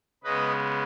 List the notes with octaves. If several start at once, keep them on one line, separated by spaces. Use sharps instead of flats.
C#3 G#3 B3 B4 D#5